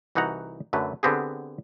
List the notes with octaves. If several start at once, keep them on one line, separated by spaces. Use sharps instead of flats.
C2 E3 D#4 F#4 F#5 A#5
F#2 D3 F#3 A3 B4
D3 B3 C4 G4 G#4